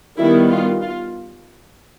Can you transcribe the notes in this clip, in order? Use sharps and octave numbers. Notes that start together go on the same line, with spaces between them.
D#3 G3 B3 E4
F4
F4